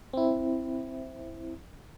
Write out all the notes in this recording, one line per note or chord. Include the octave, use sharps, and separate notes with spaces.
C4 E4